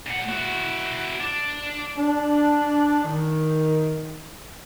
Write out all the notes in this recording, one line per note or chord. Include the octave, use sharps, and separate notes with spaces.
A#2 F#5
E4 F#4
D4
D4
D#3